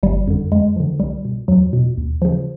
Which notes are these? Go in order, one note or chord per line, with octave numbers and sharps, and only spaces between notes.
G1 G3
F2 D3
F2 G#3
D3 F3
C2 G3
B2
E2 F#3
B2
D#2
C#3 F3